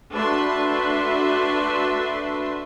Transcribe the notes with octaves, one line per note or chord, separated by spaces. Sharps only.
A3 D4 F#4 B4 E5 C6